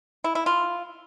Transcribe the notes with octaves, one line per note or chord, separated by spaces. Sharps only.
E4
E4
F4